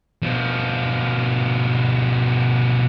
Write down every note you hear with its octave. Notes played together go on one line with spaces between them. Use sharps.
B2 F3